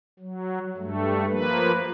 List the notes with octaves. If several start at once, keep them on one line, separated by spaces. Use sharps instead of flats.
F#3
G2 A3
F3 A#3 B4